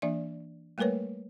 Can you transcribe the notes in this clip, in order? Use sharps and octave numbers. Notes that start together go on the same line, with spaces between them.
E3 A#3 D4 D5 E5
G3 A3 A#3 A#4 B4 C#5